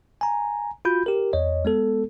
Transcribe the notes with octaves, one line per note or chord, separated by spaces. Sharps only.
G#5 A#5
F4 F#4 B5 G6
G4 A#4
E2 C#5 D#5
G#3 B3 A4